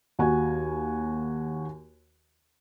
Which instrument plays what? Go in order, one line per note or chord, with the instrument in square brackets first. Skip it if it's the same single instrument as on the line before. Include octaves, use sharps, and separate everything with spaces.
[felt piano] D#2 F#4 G#5